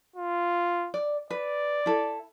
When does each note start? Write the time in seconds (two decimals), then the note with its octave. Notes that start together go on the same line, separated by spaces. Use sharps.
0.16 F4
0.94 D5
1.31 B4 D5
1.86 E4 A4